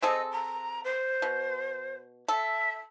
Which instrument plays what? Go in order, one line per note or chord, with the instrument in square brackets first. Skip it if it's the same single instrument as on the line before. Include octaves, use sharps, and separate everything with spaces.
[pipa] C4 G#4 A4 [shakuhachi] D#5
[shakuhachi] A#5
C5
[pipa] B2
[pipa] A4 [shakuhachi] E5